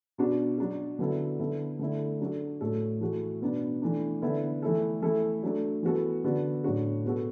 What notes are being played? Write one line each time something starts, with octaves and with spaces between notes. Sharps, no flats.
B2 B3 D4 F#4
F#3 D4 F#4
D3 F#3 B3 E4 A4
D3 B3 E4 A4
D3 A3 E4 A4
F#3 D4 F#4 A4
A2 A3 F#4 A4
E3 A3 F#4
B2 B3 D4
E3 A3 D4
D3 B3 E4 A4
E3 A3 E4 A4
E3 A3 E4 A4
F#3 A3 D4
E3 B3 F#4 A4
D3 B3 F#4
A2 F#3 D4 F#4
B2 B3 F#4 A4